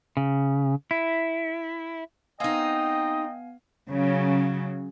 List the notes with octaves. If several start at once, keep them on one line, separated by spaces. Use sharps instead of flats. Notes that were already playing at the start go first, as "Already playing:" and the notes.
C#3
E4
B3 C4 D#4 D#5 F5 G5 G#5
C#3 F#3